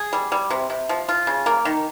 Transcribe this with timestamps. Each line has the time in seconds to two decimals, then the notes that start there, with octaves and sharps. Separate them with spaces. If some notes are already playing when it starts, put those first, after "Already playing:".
Already playing: G#4
0.13 G3
0.32 G3
0.50 C3
0.70 C3
0.89 F3
1.09 F4
1.27 C#3
1.46 A#3
1.65 D#3